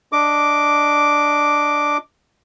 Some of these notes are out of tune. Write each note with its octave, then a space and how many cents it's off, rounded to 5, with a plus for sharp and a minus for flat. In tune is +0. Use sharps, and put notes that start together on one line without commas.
D4 +0 D#5 +0 D6 +0